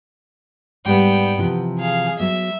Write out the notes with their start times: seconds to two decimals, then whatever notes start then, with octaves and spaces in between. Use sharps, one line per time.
0.85 G#2 G3 B3 G5
1.38 C3 E3 F3
1.79 G#4 F5
2.20 F#3 B3 E5